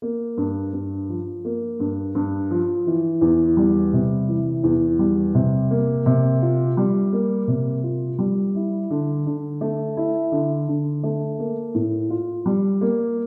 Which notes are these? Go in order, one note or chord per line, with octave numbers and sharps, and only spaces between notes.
A#3
G2
G2
F3
A#3
G2
G2
F3
E3
E2
G3
C3
E3
E2
G3
C3
A#3
C3
F4
G3
A#3
C3
F4
G3
E4
D3
D3
A3
E4
D3
D3
A3
A#3
A2
F4
G3
A#3